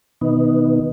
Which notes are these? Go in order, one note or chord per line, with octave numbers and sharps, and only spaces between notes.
B2 D#3 B3 D#4